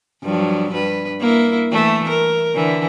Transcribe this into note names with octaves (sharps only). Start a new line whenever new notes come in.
G2 F3 F#3
G2 B4
A#3 E4
E3 A3
A#4
D3 E3